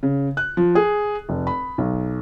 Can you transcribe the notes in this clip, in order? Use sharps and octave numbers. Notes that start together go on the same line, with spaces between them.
C#3
F#6
F3
G#4
F1
B5
B1